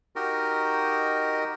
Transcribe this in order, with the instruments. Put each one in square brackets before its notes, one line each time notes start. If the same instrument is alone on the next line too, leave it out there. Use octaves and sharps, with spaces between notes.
[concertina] D#4 F#4 G4 A#4 D#5